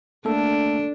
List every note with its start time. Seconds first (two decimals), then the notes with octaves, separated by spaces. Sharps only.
0.25 A3 A#3 D4 A4